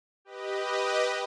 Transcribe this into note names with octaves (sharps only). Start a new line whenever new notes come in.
G4 B4 D#5